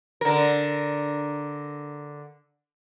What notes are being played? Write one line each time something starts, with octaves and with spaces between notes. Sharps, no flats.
D3 A#4